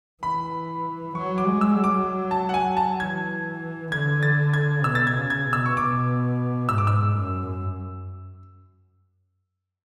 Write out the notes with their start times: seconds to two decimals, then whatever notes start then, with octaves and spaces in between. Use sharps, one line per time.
0.23 E3 B5
1.15 F#3 C#6
1.38 D6
1.46 G#3
1.61 E6
1.77 F#3
1.84 D6
2.31 A5
2.49 F#5
2.54 G#5
2.77 A5
2.99 E3 G#6
3.92 D3 G#6
4.23 A6
4.54 G#6
4.84 B2 E6
4.95 A6
5.07 G#6
5.15 C#3
5.30 G#6
5.46 B2
5.53 E6
5.66 C#6
5.77 B2 D6
6.69 G#2 E6
6.78 D6
6.87 E6
7.16 F#2